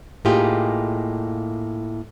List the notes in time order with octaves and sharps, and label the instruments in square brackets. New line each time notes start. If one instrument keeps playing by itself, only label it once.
[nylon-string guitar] A2 A#3 D#4 F4 G4 G#4